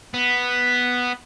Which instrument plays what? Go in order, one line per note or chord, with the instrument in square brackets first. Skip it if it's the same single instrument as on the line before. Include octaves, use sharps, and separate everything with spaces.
[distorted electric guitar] B3